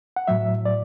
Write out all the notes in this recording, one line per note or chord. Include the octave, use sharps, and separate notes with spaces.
F#5
A2 F#3 E5
D5